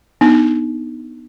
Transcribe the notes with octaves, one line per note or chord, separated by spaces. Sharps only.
B3 D4 D#4